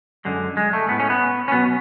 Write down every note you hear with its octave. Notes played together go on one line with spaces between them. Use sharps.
F#2 D3 G#3
G#3
A3
A2 G#3 B3
C#4
B3
C#4
B2 F#3 B3